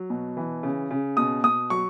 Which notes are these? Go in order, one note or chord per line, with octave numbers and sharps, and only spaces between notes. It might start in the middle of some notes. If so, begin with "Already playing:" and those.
Already playing: F#3
B2
E3
C#3
C#3
B2 D#6
B2 D#6
F#3 C#6